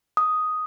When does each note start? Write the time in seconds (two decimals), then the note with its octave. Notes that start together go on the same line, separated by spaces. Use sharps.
0.17 D#6